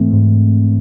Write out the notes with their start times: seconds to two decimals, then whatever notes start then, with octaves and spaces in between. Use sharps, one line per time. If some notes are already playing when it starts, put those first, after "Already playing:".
Already playing: G#2 E3 A3 C4
0.13 G#2